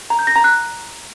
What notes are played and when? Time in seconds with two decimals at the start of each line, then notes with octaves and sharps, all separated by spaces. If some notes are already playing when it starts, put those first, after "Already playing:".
0.10 A#5
0.19 G6
0.27 A#6
0.36 A#5
0.44 F#6